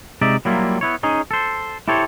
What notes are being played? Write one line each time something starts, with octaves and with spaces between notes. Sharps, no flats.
C3 G#3 D#4 D5 E5
F#3 G3 A#3 E4 F4
B3 E4 C#5
C#4 D#4 G#4
A4 C5
E4 G4 A4 C5 C#5